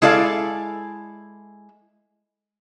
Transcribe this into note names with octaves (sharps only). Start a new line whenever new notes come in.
G#3 E4 A4 D5 F5